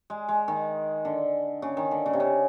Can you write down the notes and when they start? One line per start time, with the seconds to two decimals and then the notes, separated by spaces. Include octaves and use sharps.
0.10 G#3
0.29 G#3
0.48 D#3
1.05 D3
1.62 C#3
1.77 D#3
1.91 D3
2.06 C#3
2.13 C3
2.20 C#3